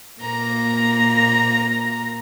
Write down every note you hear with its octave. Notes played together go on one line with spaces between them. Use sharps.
A#2 A#3 A#5 A#6